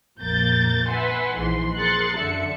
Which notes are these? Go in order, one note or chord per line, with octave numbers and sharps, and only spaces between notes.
A#1 F2 A#3 A#4 G6 A6
B4 E5 F#5 G#5 C6
A#1 G#2 E3 C6
G#4 A#4 C6 F#6 A6 C#7
F#2 D3 E5 C#7